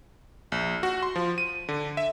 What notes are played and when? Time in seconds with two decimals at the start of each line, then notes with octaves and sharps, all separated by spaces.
0.52 A#1
0.83 F#4
1.02 C6
1.16 F3
1.38 D#7
1.69 D3
1.97 E5